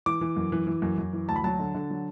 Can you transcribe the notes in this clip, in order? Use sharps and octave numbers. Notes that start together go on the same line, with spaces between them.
E3 D6
E3
F#2
E3
E3
F#2
F#2
E3
D2 A5
B5
F#3 A5
D3
D3
F#3